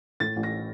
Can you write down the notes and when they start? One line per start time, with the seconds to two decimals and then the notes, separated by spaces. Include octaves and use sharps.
0.20 A2 A6
0.36 A1
0.43 A#6